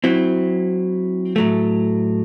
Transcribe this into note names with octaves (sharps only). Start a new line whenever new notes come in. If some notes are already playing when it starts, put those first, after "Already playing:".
F#3 C4 E4
A2 F#3 A3